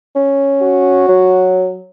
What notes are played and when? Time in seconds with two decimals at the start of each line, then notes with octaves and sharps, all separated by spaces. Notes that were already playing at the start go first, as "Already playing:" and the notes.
0.16 C#4
0.62 F#4
1.09 F#3